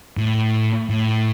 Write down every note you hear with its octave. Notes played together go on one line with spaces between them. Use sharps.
A2
A2